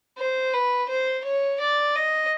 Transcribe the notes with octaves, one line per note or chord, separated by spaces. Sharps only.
C5
B4
C5
C#5
D5
D#5